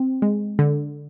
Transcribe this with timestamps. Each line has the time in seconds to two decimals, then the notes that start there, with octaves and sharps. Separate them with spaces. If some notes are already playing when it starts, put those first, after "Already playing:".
Already playing: C4
0.22 G#3
0.59 D3